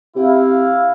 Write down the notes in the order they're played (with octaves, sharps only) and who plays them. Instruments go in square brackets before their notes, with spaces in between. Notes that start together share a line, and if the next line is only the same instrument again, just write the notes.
[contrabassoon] C3 [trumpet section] E4 F5